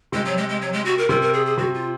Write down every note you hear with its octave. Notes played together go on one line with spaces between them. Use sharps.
C3 G#3
F#3
G#3
G#3
F#3
G#3
F#4
A#4
C3 A#4
A#4
G#4
G#4
C3 F#4
F4